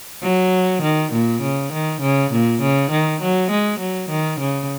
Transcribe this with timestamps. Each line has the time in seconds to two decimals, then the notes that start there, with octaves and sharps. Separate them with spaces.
0.23 F#3
0.82 D#3
1.12 A#2
1.41 C#3
1.72 D#3
2.01 C#3
2.32 A#2
2.61 C#3
2.91 D#3
3.21 F#3
3.50 G#3
3.79 F#3
4.09 D#3
4.40 C#3